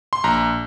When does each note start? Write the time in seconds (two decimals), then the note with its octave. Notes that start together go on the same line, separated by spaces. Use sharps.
0.13 C6
0.24 A#1 A#5